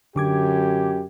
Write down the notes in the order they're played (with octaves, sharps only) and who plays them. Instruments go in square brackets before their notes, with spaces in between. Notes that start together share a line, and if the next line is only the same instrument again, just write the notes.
[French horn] F#2 [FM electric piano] D3 D6 G#6 [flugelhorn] G4